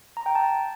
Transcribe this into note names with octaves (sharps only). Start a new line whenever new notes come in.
A#5
G5
A5